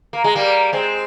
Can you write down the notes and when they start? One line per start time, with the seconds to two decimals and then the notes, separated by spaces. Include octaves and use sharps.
0.13 A#3
0.24 G#3
0.35 G3 A#3
0.73 G#3 C4